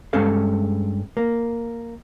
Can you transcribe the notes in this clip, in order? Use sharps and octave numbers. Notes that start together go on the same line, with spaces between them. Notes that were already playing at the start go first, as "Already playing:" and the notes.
G2 G#3 C#4 G#4 A4 F5
A#3